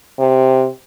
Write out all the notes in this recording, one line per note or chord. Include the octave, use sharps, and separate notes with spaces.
C3